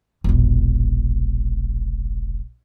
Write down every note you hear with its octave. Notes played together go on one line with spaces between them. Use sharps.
E1 A#1